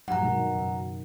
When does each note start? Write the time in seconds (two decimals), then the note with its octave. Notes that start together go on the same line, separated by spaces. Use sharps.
0.08 G2 A#2 F3 F#3 F#5 A#5
0.22 B2 D#3 F#3 G#3
0.52 F#2 C#3